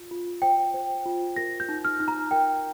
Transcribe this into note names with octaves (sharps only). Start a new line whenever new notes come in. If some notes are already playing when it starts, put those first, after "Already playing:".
Already playing: F4
F4
C5 G5
C5
F4
A#4 A#6
G6
D#4
F6
D#4
A#5
A#4 G5